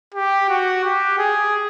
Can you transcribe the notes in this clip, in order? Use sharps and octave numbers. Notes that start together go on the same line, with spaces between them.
G4
F#4
G4
G#4